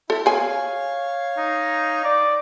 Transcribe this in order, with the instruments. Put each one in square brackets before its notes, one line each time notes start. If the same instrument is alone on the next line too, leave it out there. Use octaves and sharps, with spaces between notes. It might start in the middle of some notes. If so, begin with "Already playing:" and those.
[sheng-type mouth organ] E4 [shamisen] A4
[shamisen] G#4 G#5 [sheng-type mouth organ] C#5 F5
[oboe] D#4
D5